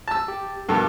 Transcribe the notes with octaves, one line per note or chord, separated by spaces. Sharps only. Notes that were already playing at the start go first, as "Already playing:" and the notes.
A5 E6
G4
G2 B2 A#3 G4 A4